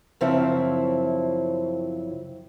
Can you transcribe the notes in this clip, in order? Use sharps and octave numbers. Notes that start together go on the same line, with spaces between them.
F#2 C#3 F3 C4 E4